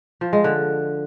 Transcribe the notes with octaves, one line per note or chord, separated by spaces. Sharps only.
F3
G#3
D3